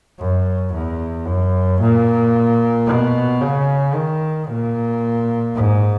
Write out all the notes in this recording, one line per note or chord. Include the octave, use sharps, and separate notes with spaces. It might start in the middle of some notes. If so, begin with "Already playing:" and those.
F#2
E2
F#2
A#2
B2
C#3
D#3
A#2
G#2